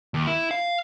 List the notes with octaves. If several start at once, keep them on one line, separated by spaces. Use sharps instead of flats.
D#2
E4
F5